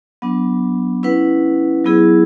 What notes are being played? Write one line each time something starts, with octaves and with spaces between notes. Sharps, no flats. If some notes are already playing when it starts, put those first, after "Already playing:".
F#3 B3 D4
C#4 E4 B4 F#5
F#3 B3 E4 G#4